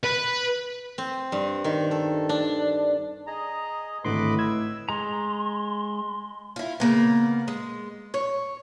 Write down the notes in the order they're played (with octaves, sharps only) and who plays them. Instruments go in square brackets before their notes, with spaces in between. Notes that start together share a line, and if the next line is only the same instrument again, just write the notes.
[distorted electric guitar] B4
[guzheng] C4
G2
D#3
A4
D4
[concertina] G#4 D#5 [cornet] A#5
[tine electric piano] G#1 D3 C6 [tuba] A2 [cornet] B4 [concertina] D#5 B5 D6
[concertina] E6 [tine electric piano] G#6
[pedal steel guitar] G#3 A#5 [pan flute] C6
[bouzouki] E4 F4
C#3 A#3 B3
G#3
C#5